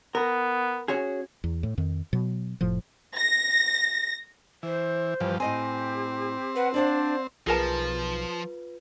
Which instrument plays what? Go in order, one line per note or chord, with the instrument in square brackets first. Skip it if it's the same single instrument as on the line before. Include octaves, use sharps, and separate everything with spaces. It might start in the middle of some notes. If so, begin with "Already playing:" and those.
[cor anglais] B3 [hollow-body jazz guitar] A#4
[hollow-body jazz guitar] C#4 F#4 G#4
[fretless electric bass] E2
A2
F2 D#3
B2 F#3
F1 A2 F3
[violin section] A#6
[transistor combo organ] E3 [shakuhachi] C5
[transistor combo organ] G2 F3 [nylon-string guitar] E3
[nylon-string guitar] A2 D#5 G#5 [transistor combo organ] C4 [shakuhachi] G4
[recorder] B4 [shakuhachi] F#5
[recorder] D4 [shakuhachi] C5 [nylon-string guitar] D5 F5 F#5
[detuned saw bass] B1 [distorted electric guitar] F3 [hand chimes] F4 B4 [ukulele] G#4 A#4 A5